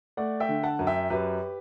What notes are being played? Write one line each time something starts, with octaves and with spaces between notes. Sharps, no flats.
A3 D5 F#5
E5 G5
D3
F#5 A5
F#2
E5 G5
F#2 G4 B4